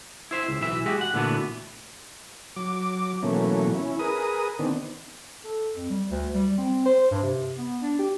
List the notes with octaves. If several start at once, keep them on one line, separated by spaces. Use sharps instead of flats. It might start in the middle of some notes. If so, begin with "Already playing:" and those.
E4 C5 E5
C#2
B1 E3 E5
G#3 F#4 G4
F#5
A#2 D3 E3 A3 B3 F#4
F#3 D6
B2 E3 F#3 A3 A#3 C#4
C#4 E4
G#4 A#4 B4 D#6
D#3 B3 C4 D4
A4
F2
G3
D2
G3
C4
C5
G2
C3
B3
D4
G4